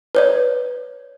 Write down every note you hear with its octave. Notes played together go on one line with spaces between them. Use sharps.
B4 C#5 D5